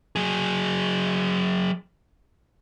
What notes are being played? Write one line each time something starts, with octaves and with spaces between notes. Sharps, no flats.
F#3 G#4